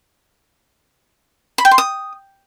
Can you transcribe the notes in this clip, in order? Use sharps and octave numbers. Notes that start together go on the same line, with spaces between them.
B5
G5
C6
D#6